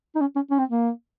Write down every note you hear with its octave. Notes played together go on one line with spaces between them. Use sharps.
D#4
C#4
C#4
C#4
C4
A#3